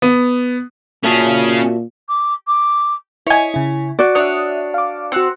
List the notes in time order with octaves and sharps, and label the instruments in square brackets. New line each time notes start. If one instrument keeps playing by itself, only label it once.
[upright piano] B3
[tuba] A#2 [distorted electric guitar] C#4 G#4 [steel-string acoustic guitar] F#4 E5 A5
[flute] D6
D6
[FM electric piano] E4 D#5 [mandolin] C#5 G#5
[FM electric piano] C#3 E4
[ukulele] F#4 D5
[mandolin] D4 C#5 [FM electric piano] E5 D#6
[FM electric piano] F5 D6
[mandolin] C4 [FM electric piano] F#4 F#6 C#7